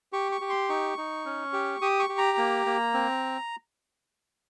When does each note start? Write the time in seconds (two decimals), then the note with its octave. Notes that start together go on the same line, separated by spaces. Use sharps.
0.13 G4 C#6
0.32 C#6
0.41 G4
0.49 C6
0.69 D#4 C#6
0.97 D#4
1.26 C#4
1.53 G4
1.82 G4 D#6
1.99 C#6
2.09 G4
2.18 A#5
2.38 A#3
2.66 A#3
2.94 C4